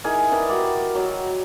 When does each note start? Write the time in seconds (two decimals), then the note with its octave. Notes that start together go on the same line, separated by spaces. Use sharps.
0.04 D#4 E4 G#4 A#4
0.32 A#4 B4 D5 G5
0.49 F#4 G4 A#4 D5
0.95 F#3 A#4